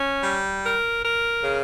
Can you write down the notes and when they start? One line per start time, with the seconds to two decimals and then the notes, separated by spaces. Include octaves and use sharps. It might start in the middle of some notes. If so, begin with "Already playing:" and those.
Already playing: C#4
0.22 G3
0.63 A#4
1.02 A#4
1.42 C#3